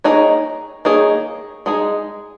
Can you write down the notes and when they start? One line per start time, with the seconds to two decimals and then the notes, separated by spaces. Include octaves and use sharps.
0.04 D#3 A#3 D#4 G#4 C#5
0.85 D#3 A#3 D#4 G#4 C#5
1.66 G#3 D#4 G#4